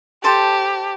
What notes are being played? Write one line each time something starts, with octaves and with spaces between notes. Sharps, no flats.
G4 A4 C5 A5